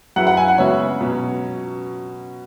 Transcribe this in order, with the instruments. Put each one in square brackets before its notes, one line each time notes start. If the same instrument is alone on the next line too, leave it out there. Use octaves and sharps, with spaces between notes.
[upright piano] F#2 F#3 E4 G#4 B4 [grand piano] F#5
[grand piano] F#5
G#5
F#5
[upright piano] C#3 G#3 B3 F#4 E5 [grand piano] C#5
[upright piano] B2 F#3 C#4